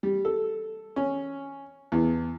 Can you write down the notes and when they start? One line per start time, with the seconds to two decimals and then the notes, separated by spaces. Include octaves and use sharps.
0.03 G3
0.25 A4
0.96 C#4
1.92 E2